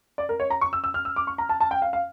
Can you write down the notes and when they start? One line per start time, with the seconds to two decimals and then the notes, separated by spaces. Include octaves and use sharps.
0.18 D5
0.29 A#4
0.40 C#5
0.50 A#5
0.61 C#6
0.73 E6
0.84 E6
0.94 F6
1.05 E6
1.16 D6
1.27 C#6
1.38 A#5
1.49 A5
1.60 A5
1.71 G5
1.82 F5
1.93 F5